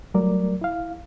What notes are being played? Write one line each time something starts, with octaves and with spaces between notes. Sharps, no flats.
F#3 G3 A3 A#4 D5
E4 F5